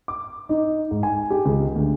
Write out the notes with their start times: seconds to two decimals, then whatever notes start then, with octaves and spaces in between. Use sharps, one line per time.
0.08 D6
0.49 D#4
0.91 G#2
1.03 G#5
1.30 G4
1.45 C#2
1.76 D2